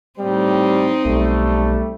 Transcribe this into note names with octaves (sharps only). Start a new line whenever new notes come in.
A2 G3 C4 D#4
B1 G3 A3